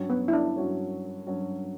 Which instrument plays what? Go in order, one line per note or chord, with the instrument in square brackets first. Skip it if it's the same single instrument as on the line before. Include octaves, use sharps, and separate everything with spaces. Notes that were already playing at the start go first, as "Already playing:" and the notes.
Already playing: [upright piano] G2 F#3 C#4 F#4 C#5
[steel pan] B3
E4
D4
[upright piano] G2 F#3 C#4 F#4 C#5
G2 F#3 C#4 F#4 C#5